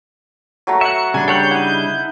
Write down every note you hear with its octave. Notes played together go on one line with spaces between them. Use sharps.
F#3 A3 A#5
E5 F#5 C#7
C#3 G3 D4 G#5
A4 C#5 F#5 G5 G6
D#4 E4 F#5